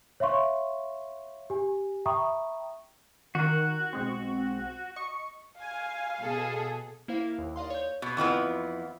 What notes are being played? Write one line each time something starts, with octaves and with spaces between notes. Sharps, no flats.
C#5 E5 F5 C6 C#6
G4 G#5
E5 G5 A#5 B5 C#6 D#6
D#3 F#4 A#4
B1 G#3 C4
D#5 C#6 C#7
F5 G#5
B2 G#4 A4
A#3 E4 C5 E5 F5
D#2
D5 D#5 F5 C6
C#5 G6
B2
F2 E3 F3 B3